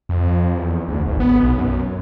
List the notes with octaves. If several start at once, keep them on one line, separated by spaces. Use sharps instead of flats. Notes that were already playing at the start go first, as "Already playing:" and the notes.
F2
E2
D2
G#1
B3
B1
F#2